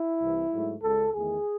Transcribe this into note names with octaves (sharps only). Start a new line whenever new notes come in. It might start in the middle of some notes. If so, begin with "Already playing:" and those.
Already playing: E4
C2 C3 E3
G#2 F#3 A3
C#2 C#3 G#3 A4
E2 D#3 A3 G#4